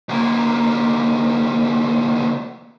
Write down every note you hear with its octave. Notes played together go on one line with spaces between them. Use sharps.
D2 A#3